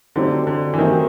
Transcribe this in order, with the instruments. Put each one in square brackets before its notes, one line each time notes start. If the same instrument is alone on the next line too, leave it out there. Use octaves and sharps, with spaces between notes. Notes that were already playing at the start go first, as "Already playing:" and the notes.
[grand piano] D3 [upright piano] F#3 A3 C4 D#4 G4
[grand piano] D3
E3
[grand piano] D#3 [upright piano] F#3 A3 C4 D#4 G4